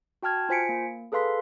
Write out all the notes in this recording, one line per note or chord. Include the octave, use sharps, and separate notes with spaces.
F#4 G5 A5 F6 G#6
F4 C5 G#5 B6 C#7 D7
A#3
G#4 A4 B4 F5 C6 B6